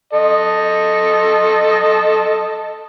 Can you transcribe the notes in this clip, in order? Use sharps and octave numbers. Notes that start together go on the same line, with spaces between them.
A4 D#5